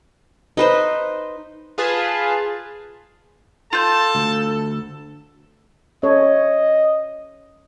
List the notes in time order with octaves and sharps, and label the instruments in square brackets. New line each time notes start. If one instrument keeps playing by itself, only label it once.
[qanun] D#4 B4 C5
[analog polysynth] F4 G#4 B4 A5
[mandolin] F4 G6 [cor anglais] A4 [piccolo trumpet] A5
[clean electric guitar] D2
[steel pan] C#4 A4 C#5 [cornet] D#5